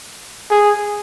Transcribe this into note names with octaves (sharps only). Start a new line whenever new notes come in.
G#4